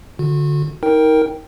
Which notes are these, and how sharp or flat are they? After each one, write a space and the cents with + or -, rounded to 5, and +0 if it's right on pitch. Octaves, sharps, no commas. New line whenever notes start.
D3 +0 F#4 -35
D#4 +35 A#4 +0 G5 +0